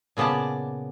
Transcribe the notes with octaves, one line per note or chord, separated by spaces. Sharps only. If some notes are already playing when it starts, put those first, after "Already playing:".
A#2 C#3 B3 D5 A5